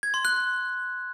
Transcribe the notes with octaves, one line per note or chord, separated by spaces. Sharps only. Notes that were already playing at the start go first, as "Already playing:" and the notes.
G#6
C6
F#6